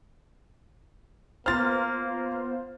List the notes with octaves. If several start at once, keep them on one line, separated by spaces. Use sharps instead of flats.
A#3 B3 F4 C5 F6 A6